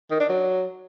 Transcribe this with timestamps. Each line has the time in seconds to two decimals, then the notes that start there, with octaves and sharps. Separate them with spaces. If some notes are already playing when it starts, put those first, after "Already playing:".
0.11 D#3
0.20 D4
0.29 F#3